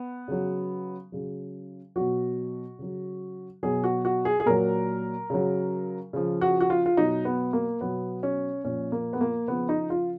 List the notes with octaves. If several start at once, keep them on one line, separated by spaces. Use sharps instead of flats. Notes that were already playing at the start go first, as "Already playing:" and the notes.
Already playing: B3
C#3 F#3
C#3 F#3
B2 F#3 F#4
C#3 F#3
B2 F#3 G#4
F#4
F#4
G#4
G#4
A#2 F#3 A#4
C#3 F#3
C#3 F3
F#4
F#4
F4
F4
B2 F#3 D#4
B3
A#3
B2 F#3 B3
C#4
A#2 F3 C#4
A#3
B3
A#3
C#3 F3 B3
D#4
F4